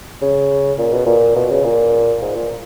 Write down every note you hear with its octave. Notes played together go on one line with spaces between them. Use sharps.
C#3
A#2
B2
A#2
B2
C#3
A#2
G#2
A#2